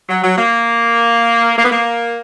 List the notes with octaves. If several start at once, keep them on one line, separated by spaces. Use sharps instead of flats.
F#3
F#3
A#3
A#3
B3
A#3